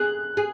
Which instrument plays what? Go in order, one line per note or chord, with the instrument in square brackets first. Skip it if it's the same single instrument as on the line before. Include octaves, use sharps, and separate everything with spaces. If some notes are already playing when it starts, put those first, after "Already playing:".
Already playing: [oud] G#4 [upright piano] F#6
[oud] G#4